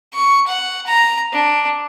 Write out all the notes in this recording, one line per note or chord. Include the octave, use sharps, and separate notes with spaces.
C#6
F#5
A#5
D4